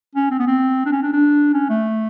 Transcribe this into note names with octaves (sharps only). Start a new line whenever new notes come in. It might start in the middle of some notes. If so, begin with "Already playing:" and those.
C#4
C4
B3
C4
D4
C#4
D4
D4
C#4
A3